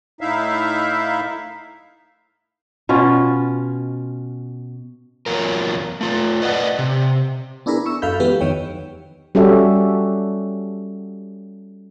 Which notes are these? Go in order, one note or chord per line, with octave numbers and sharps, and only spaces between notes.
A2 D#4 E4 E5 F5
B2 C#4 F4
E2 F#3 F4 A#4
A3 F4
B4 D5 D#5 F#5
C3
B3 D4 E4 G#4 A#4 B4
C#6 E6
F#2 A4 E5 F5 B5 G6
E3 F#3 G#3 B3 G4 B4
F2 D#3 C#5 G5
G3 C#4 F#4 G4 A4 E5